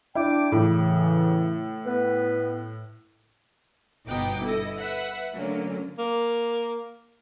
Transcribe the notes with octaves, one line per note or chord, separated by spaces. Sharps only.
D4 E4 G5 D6
A2 C#3 E3
B3 B4
G1 B2 B3 D#4 G5 D6
E4 A4 D#5
B4 E5 F#5
D3 F#3 A3 A#3 C#4
A#3